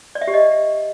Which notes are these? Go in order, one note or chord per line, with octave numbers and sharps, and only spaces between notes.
D5
E5
G4
D#5